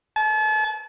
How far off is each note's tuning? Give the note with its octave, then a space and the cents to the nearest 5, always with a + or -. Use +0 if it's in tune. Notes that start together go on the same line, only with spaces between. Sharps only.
A5 -40